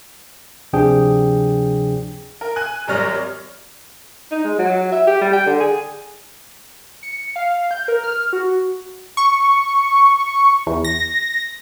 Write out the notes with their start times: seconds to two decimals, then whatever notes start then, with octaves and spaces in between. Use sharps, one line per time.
0.73 D2 C3 F3 D4 G#4 G5
2.41 A#4
2.56 G#5 F#6
2.87 G#1 F#2 G3 C#5 F6 A#6
4.31 D#4
4.45 G#3
4.59 F#3
4.92 E5
5.07 G4
5.21 G3
5.33 G5
5.47 D3
5.60 G#4
7.03 C#7
7.36 F5
7.71 G6
7.88 A#4
8.04 F6
8.33 F#4
9.17 C#6
10.67 E2
10.85 A#6